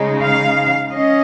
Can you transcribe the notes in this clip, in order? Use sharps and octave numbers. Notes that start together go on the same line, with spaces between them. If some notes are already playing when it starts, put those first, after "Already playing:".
Already playing: C#3 G#3 D#4
F5
C#4 D#5